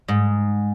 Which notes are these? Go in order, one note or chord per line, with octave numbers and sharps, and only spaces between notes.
G#2